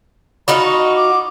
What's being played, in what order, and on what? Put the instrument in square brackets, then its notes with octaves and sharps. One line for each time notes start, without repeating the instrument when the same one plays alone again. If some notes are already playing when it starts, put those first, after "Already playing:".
[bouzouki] D#4 F4 F#4 [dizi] B5
[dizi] C#6
D6